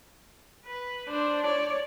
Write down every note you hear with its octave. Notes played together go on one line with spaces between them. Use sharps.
B4
D4 C5
C#5 D5